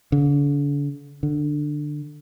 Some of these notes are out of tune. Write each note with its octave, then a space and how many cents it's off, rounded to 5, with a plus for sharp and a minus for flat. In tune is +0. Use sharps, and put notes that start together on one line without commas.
D3 -40
D3 +15